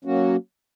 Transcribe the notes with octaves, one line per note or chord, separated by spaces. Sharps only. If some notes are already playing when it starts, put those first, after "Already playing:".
F#3 A#3 C#4 F#4